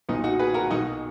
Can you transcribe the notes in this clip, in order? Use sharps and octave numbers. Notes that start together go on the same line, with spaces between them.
B1 A#2 B3 D#4
D#4 F#4
G#4 B4
F#4 A#4
B1 B2 D#4 F#4